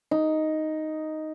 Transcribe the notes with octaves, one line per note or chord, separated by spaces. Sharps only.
D#4